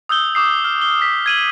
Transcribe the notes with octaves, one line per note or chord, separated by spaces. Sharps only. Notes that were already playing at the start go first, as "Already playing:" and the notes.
D#6 E6 G6 G7
D6 D#6 C7
F6
G7
B6
G#6 D#7 F#7